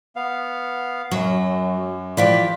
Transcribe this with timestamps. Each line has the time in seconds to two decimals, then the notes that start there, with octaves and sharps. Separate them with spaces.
0.16 B3 F5
1.11 F#2 F#3
2.17 E3 F3 G4 D5 F5 B6